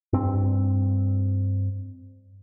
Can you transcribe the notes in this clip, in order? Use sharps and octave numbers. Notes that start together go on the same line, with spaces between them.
G2 C4